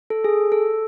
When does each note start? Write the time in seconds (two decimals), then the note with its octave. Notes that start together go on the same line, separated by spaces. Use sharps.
0.10 A4
0.24 G#4
0.52 A4